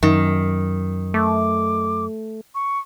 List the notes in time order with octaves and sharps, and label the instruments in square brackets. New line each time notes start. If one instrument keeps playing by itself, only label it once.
[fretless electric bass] F#2 [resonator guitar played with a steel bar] D#3
[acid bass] A3 [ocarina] D6
[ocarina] C#6